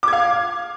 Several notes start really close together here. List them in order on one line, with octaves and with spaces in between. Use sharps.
D6 G#6 F5